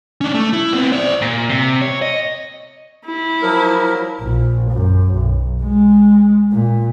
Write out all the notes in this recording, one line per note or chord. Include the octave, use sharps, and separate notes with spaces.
C#4 D4
A3
E4
B3 C4
C5 D5
A#2
C3
C#5
D#5
E4
F3 F#3 A#4
A#1
F#2
B1
G#3
A#2